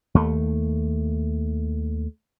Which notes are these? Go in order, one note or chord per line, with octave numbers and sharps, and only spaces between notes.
D#2 A3